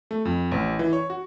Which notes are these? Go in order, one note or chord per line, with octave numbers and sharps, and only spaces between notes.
A3
F2
A1
E3
C#5
F#4